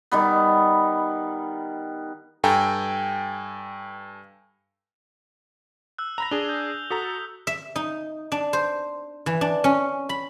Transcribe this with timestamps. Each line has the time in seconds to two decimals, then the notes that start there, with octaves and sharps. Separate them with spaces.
0.12 D#3 G3 B3
2.44 G2 A4 G5 G#5 A#5
5.98 E6 F#6
6.18 A#5 B5 A#6 F7
6.31 D4 G#4 G7
6.49 G6
6.90 F#4 A4 A#5 D#6 B6
7.47 E5
7.76 D#4
8.32 D4
8.53 C5
9.26 E3
9.41 D4
9.64 C#4
10.09 B5